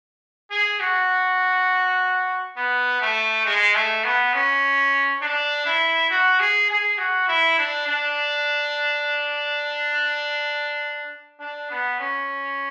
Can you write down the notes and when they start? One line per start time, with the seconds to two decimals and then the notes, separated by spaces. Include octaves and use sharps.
0.51 G#4
0.80 F#4
2.57 B3
3.01 A3
3.46 G#3
3.75 A3
4.04 B3
4.34 C#4
5.22 D4
5.66 E4
6.10 F#4
6.40 G#4
6.70 G#4
6.98 F#4
7.28 E4
7.58 D4
7.88 D4
11.40 D4
11.70 B3
11.99 C#4